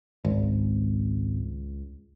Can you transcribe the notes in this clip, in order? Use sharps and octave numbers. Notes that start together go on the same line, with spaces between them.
G#1 C#2